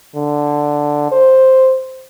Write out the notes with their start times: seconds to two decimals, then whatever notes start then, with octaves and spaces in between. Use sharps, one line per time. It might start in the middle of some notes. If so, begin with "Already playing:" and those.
0.16 D3
1.12 C5